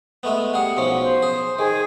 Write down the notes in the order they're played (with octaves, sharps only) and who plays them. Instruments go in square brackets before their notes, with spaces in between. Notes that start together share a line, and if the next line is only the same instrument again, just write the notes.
[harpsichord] G#3 A3 B3
[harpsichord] G3 G#4 [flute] F#5
[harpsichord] B1 F3 C#4
[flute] C5
[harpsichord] G#4
[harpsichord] D#3 [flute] G#4